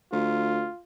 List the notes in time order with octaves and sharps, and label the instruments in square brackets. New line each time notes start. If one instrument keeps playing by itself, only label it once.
[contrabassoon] D2 [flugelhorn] F4